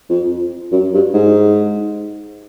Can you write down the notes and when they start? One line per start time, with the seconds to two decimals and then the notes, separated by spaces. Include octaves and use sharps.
0.09 F2
0.72 F#2
0.94 G2
1.14 G#2